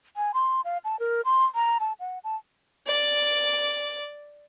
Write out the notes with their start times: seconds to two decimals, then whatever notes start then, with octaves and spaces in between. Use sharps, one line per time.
0.17 G#5
0.34 C6
0.65 F5
0.85 A5
1.00 A#4
1.25 C6
1.55 A#5
1.80 A5
2.00 F#5
2.24 A5
2.87 D5 D6